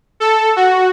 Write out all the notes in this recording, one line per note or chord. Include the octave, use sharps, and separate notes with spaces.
A4
F#4